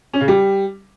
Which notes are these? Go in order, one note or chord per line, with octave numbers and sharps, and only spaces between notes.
C#4
C#3
G3